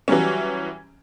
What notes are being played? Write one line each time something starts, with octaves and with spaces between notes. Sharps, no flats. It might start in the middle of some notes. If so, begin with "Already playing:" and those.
E3 F#3 G3 C#4